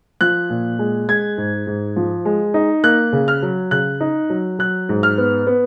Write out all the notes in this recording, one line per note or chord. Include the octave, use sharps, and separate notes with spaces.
F3 F#6
A#2
G#3
G#3 G#6
G#2
G#2
F3
G#3
D#4
A#3 F#6
C#3
F6
F#3
C#3 F#6
D#4
F#3
F#3 F#6
G#2
F6
B3
B3